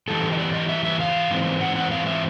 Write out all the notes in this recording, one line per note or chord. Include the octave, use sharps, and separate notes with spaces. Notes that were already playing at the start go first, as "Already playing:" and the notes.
G#2 E3 G3 A4
D#5
D5
D#5
E5
E5
F5
G#2 E3 G#3 C4
F#5
F#5
F5
E5